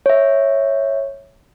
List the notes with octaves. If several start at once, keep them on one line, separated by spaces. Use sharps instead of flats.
C#5 E5